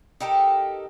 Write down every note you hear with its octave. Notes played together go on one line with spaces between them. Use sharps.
D#4 G4 A4 A#4